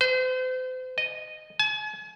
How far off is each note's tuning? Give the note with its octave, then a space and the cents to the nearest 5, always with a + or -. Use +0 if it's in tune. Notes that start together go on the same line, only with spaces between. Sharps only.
C5 -40
D#5 -10
G#5 +40